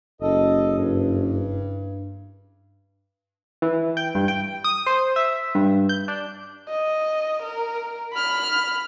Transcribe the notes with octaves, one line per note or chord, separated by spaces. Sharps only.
F#1 A4 D#5
G2
E3
G5
G2
G5
D#6
C5
E5
G2
G6
D4
D#5
A#4
B5 F6